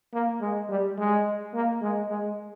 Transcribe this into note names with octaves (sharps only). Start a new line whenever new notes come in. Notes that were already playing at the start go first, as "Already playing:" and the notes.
A#3
G#3
G3
G#3
A#3
G#3
G#3